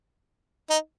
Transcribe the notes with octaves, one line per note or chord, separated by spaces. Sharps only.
D#4